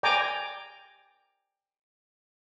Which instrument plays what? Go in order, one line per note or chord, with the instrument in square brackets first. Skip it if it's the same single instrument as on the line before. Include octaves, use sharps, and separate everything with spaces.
[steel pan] D5 G5 G#5 A#5 D6